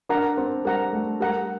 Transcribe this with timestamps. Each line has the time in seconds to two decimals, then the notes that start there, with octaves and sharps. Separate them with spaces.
0.09 D4 A#4 F#5 A#5
0.37 C4
0.65 G3 A#4 F#5 A#5
0.93 A3
1.20 G3 A#4 F#5 A#5